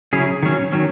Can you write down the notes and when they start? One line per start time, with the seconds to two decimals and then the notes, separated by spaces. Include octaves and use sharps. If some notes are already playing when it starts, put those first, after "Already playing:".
0.13 C#3 F#3 C#4 E4 G#4
0.43 D#3 F#3 C#4
0.73 D#3 F#3 C#4